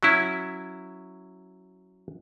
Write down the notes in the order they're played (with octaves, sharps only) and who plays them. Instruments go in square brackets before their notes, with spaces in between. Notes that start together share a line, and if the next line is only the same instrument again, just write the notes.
[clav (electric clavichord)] F#3 C#4 E4